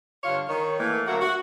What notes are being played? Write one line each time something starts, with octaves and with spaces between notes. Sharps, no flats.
G2 D3 F4 C#5 F5
D#3 C#5
A2 E3 A#3
D2 F#3 A#3 F#4 A#4 E5
F#4